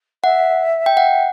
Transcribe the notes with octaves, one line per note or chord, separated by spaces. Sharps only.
E5 F#5
G5
F#5